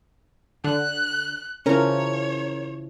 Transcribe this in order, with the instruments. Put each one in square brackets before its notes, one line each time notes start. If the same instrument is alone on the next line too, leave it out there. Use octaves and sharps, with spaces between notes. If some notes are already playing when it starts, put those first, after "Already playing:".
[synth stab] D3 [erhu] F#6
[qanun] C#3 E3 F3 [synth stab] C#4 A#4 [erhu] C#5